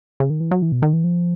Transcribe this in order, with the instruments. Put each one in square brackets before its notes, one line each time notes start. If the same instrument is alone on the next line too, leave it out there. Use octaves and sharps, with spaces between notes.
[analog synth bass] C#3
D#3
E3
F#3
E3
B2
D#3
E3
F3